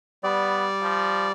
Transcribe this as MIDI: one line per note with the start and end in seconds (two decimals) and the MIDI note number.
0.24 1.32 55
0.24 0.67 59
0.24 1.32 74
0.82 1.28 53